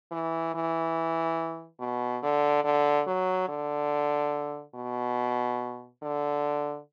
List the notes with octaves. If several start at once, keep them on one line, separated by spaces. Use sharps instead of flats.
E3
E3
B2
D3
D3
F#3
D3
B2
D3